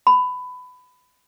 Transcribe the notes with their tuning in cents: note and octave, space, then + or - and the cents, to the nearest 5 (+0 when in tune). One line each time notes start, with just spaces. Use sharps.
B5 +20